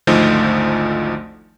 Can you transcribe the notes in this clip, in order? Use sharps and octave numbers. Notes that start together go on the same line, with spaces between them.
G#1 D2 F3 A3 D#4 C5